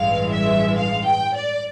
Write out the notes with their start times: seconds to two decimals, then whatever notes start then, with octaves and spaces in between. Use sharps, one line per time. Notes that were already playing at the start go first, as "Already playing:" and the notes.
Already playing: A1 G2 E3 G#3 F5
0.32 E5
0.77 F5
1.06 G5
1.35 D5